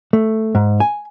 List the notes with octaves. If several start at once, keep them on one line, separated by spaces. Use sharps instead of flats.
A3
G#2
G#5